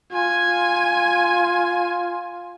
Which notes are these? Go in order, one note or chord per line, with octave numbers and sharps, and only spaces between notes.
F4 G#5